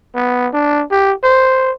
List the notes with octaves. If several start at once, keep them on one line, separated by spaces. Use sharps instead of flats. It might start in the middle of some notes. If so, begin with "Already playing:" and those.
B3
D4
G4
C5